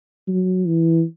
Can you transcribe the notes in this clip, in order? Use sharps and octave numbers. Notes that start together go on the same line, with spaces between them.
F#3
E3